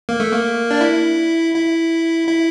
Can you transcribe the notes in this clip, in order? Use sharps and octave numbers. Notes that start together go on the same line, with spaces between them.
A#3
A3
A#3
D4
E4
E4
E4